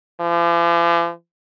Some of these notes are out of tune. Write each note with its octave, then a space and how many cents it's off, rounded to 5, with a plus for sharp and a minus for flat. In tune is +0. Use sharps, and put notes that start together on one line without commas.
F3 -45